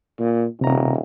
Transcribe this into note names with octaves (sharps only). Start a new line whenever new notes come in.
A#2
D#1 C3 A#5